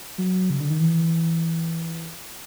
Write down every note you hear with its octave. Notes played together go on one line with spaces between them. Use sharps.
F#3
C#3
D3
D#3
E3